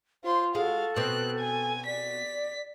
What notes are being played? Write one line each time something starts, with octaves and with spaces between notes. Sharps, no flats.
F4 C5 C6
G#3 F#4 A4 F5
B2 C4 F#6
G#5
D5 B6